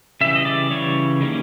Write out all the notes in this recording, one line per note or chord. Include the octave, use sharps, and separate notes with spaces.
C#3 E3 G3 E5
D#5
D5
C#3 E3 G3 C#5
D#3 G3 A#3 C#4